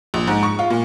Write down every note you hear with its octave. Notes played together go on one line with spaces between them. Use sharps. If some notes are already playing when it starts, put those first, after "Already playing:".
A#1
G#2
C#6
F4
A#2